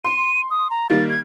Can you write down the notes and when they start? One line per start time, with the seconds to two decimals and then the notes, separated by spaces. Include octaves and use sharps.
0.05 C6 D#7
0.50 D#6
0.70 A#5
0.90 D#3 G3 A#3 A6
1.10 G#6